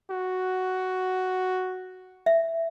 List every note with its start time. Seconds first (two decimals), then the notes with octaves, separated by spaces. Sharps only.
0.10 F#4
2.26 E5